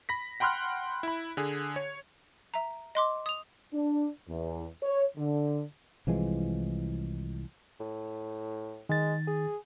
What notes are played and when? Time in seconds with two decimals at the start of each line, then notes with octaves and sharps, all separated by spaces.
0.09 B5 A#6 B6
0.40 F#5 G5 B5 C6 F6 F#6
1.03 E4 B5
1.37 D3 G#4
1.76 C#5
2.54 E5 A#5
2.95 D#5 C6 D6
3.26 D#6 F7
3.73 D4
4.29 E2
4.83 C#5
5.16 D3
6.07 C2 E3 F3 G#3
7.80 A2
8.89 D#3 G#3 A6
9.27 G#4